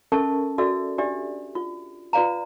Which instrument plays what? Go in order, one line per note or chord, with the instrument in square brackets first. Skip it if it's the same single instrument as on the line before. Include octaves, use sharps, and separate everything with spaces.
[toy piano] C#4 A4 A#4 E5 A5 C#6
F#4 A4 D5 E5 E6
D4 G4 D5 E5
F4
F4 B4 D5 F5 A#5